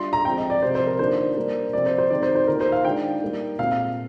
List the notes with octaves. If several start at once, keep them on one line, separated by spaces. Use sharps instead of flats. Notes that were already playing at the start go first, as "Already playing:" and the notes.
Already playing: G3 D4 F4 C6
A#5
F3 G#3 C4 G5
D#5
D5
C3 F3 G#3 C5
C5
A#4
D#3 A#3 D4 F4 C5
G3 A#3 D4
C3 F3 C4 D5
C5
C5
D#3 G#3 C4 D#4 D5
C5
C5
D#3 A#3 F4 A#4
C5
F5
D#3 G#3 D4 F4 G5
G3 A#3 D#4
A#2 G#3 C4 F5
F5